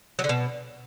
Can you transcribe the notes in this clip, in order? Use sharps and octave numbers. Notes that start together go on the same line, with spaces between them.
F#3
D3
B2